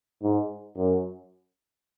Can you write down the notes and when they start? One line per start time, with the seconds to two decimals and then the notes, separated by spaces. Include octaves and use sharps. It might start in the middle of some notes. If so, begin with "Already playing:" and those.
0.23 G#2
0.77 F#2